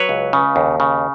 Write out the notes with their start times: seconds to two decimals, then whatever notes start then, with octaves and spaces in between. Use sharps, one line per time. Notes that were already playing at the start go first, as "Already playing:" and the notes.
Already playing: F#3 B4 C#5
0.09 C#2
0.33 C#3
0.56 D#2
0.80 C#3